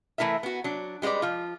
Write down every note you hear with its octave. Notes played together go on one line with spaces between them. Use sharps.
E3 A3 E4 A#4 E5
B3 F#4
F#3 D4
G3 G#3 F4 B4 D5
F3 F4